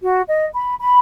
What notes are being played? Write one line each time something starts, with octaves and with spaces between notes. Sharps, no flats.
F#4
D#5
B5
B5